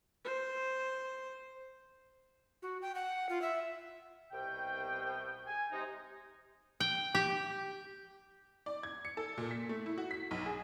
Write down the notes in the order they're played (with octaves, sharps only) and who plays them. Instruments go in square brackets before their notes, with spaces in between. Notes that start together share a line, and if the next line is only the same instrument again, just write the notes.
[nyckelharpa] C5
[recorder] F#4
G5
F#5
F4
E5
[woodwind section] C2 B2 G5
G#5
C3 G#3 D#4
[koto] G5
G4
[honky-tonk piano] D5
G#6
C#7
A4
A#2
B6
A3
E4
F#4
B6
B1
G#4